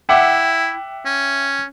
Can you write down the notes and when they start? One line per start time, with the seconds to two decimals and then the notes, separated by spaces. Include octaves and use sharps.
0.09 E4 E5 F#5 G5 D6
1.05 C#4